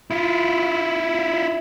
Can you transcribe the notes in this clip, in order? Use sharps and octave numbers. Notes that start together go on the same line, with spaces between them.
E4 F4